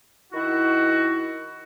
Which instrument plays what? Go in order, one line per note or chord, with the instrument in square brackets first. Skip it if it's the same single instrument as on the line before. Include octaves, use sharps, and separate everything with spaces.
[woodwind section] D#3 E4 F#4